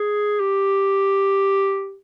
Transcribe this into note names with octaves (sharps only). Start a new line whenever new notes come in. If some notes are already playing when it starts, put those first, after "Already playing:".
Already playing: G#4
G4